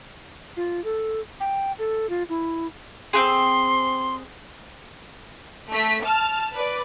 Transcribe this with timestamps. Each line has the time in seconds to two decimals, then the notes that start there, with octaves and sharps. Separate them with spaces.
0.57 F4
0.84 A4
1.40 G5
1.79 A4
2.09 F4
2.29 E4
3.13 C4 F#4 G#4 C6
5.71 A3 B6
6.02 A5 F6
6.54 B4 D5